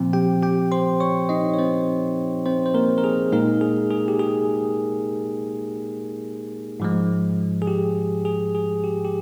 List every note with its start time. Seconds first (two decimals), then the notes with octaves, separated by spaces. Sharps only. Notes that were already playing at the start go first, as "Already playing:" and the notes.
Already playing: A#2 F3 C4
0.13 G4 G5
0.43 G4 G5
0.72 C5 C6
1.00 C#5 C#6
1.29 D#4 D#5
1.54 C#5
1.59 C4 C5
2.46 C4 C5
2.66 C5
2.74 A#3 A#4
2.98 A#4
3.04 G#4
3.32 A#2 G#3 A#3 D#4 A#4
3.61 G#4
3.90 G#4
4.08 G4
4.20 G#4
6.80 G#2 F3 G#3
7.62 G#4
7.67 G4
8.25 G#4
8.55 G#4
8.84 G4
9.05 G4